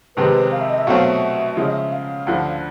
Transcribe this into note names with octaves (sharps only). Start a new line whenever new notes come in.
F2 C3 D#3 G#3 C4 B4
F5
E5
D#5
E5
B2 F#3 A3 C4 F5
E5
C#3 F3 G#3 E5
D#5
E5
F5
D2 D3 F3